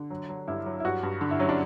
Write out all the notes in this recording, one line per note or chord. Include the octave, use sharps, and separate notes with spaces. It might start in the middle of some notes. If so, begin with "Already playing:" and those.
Already playing: D3
F#3
F#3
G2 E4
F#3
E4
G2 F#4
G2
D3
E4
F#3 C#4
D4